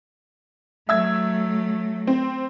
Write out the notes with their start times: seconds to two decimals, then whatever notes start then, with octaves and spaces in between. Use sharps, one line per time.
0.89 F#3 A3 E5 E6 G#6
2.07 C4